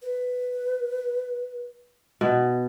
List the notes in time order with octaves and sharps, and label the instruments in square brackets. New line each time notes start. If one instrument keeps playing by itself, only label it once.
[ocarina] B4
[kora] B2